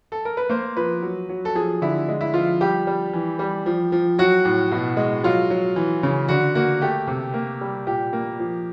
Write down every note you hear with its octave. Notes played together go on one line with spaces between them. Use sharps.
A4
A#4
B4
A#3 C5
F3 B4
F#3
F#3
A4
F3 G#4
D3 E4
G#3
E4
F3 F4
G3 G4
G3
E3
G3
F3
F3
F#3 F#4
A2
B2
G#3
F#3 F4
F#3
E3
C#3
D3 F#4
A#3 F#4
A3 G4
C3
A#3
G3
A#2 G4
A#3
F3